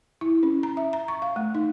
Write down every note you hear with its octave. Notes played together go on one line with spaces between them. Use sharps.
E4
C#4
A#5
E5
A#5
C#6
F5
A3
D#4